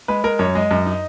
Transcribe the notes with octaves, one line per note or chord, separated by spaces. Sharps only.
G#3 B4
G#3 A#4
F#2 C#5
G#3 D#5
F#2
D#4